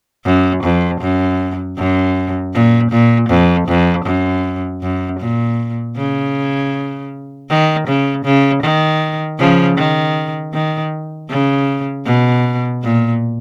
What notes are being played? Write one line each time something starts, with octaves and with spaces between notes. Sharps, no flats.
F#2
F2
F#2
F#2
A#2
A#2
F2
F2
F#2
F#2
A#2
C#3
D#3
C#3
C#3
D#3
C#3 F3
D#3
D#3
C#3
B2
A#2